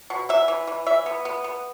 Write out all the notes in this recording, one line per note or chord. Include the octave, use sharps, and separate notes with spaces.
B2
E3 E5
E3
E3
E3 E5
B3
B3
B3